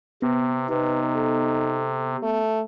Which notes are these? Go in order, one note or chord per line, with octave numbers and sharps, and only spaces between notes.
C3 B3
C3 D#4 B4
A4
A3